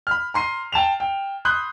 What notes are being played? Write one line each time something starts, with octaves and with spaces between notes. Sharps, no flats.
B5 F6
A#5 C6 C7 D#7
G5 A5 E7 F7
G5
B5 C6 D#6 F#6 G6